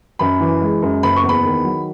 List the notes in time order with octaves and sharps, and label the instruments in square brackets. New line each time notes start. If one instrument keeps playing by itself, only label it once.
[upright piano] F#2 B5
E3
G#3
F#2
F#1 B5
C#6
E2
B5
D#3
F#3